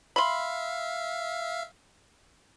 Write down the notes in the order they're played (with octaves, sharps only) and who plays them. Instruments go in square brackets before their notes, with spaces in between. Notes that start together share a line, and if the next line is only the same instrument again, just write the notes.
[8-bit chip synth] E5 F5 [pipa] B5 C6